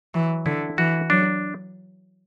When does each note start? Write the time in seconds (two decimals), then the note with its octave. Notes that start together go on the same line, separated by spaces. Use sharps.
0.14 E3 F#3
0.46 D3 E4
0.78 E3 F#4
1.10 F#3 D4